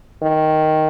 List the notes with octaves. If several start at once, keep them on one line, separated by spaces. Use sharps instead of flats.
D#3